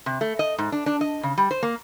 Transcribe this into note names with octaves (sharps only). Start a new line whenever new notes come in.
C3
A3
D#5
G#2
D4
D4
D#5
C#3
G3
C5
A#3